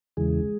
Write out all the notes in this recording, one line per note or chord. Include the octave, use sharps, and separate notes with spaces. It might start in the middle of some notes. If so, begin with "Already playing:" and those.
E2 C#3 E3 G#3 G#4